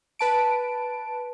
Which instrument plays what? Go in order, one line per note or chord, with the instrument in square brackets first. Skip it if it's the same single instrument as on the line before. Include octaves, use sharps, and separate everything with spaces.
[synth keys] B4 A5 D7